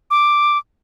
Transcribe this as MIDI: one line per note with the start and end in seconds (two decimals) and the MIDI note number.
0.10 0.58 86